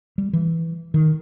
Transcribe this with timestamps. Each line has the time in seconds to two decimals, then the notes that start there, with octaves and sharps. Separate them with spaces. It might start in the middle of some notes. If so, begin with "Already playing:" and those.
0.18 G3
0.33 E3
0.94 D#3